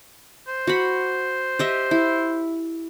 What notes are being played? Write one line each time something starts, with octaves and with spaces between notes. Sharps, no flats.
C5
F#4 B5
G4 D#5 E5
E4